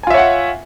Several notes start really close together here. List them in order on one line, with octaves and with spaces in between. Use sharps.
G#5 F4 E5 C#5 F#5